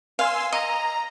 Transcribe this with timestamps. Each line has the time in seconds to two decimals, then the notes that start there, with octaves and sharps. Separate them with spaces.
0.19 F5 G#5 C6 E6
0.52 D#5 A#5